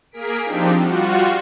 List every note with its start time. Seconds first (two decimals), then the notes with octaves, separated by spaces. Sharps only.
0.12 A#3 G#4 A#4 B6 D7
0.45 F3 C4 D4 D#4 G4
0.79 G3 F4 F#4